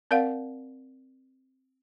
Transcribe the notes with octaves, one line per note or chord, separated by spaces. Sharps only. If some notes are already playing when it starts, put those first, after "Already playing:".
C4 A#4 D5 F5 F#5